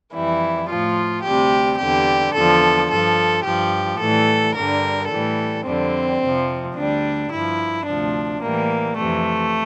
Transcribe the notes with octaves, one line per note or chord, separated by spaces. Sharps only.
F2 E3 G3 E4
A2 F3 F4
D2 C3 G3 G4
E2 D3 G3 G4
E2 D3 F3 A4
G2 F3 A4
G2 F3 G4
A2 E3 G3 A4
G2 D3 G3 A#4
A2 E3 G3 A4
F2 D3 G3 C4
F2 C3 F3
D2 D3 G3 D4
G2 F3 E4
D2 C3 F3 D4
A2 E3 G3 A#3
F2 C3 E3 A3